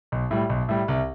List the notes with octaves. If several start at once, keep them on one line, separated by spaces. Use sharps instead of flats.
B1
A2 G3
B1
A2 G3
C2